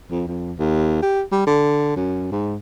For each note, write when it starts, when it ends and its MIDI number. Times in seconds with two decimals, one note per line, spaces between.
0.11 0.25 41
0.27 0.53 41
0.59 1.01 39
1.02 1.22 67
1.32 1.46 55
1.47 1.94 50
1.96 2.31 42
2.32 2.56 44